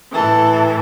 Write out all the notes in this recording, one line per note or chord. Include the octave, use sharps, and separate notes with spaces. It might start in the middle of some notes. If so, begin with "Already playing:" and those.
A2 E3 A4